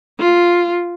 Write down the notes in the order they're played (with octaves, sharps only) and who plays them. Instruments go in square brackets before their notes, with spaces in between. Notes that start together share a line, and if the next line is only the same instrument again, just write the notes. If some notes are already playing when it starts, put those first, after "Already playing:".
[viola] F4